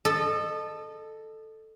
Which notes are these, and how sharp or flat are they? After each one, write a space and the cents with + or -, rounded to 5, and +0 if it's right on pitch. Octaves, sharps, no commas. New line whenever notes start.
A4 +0 D#5 -30